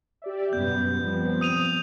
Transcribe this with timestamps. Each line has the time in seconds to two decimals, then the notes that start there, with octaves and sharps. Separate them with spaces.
0.22 G4 D5 E5
0.53 F#2 B2 G3 B3 G6
1.00 F3 G3 C4
1.41 D#6 D#7 F7